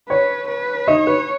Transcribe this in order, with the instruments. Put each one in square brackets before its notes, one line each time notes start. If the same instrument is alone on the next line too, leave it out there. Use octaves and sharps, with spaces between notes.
[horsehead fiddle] B4 [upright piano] C#5
[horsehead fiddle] B4
[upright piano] D#4 D#5 [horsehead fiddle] C#5
[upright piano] B4